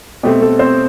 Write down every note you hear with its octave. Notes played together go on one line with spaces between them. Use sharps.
B2 A3 C4 G4
A3 A4
C4 C5